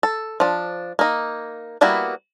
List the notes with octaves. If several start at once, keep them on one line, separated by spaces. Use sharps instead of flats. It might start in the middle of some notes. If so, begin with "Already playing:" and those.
A4
F3 D4
A#3 D#4
G3 A#3 B3 E4 F#4